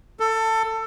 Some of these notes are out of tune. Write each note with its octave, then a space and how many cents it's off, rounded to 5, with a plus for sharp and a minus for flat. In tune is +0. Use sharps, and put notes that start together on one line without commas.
A4 +20